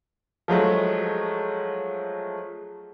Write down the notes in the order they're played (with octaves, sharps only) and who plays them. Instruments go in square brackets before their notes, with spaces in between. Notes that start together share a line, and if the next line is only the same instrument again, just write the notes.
[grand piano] F3 F#3 G#3 A3